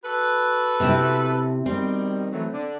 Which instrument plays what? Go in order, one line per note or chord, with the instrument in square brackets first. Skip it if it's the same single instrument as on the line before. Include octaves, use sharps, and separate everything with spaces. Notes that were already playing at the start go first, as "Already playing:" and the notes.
[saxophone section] F#4 A4 B4
[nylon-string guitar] C3 C4 E4
[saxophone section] B2 D#3 G3 [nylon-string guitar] C4
[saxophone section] E3 F#3 A3
D3 D4